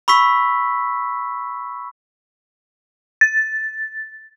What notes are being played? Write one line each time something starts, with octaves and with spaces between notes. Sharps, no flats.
B5 C#6 E6 B6
A6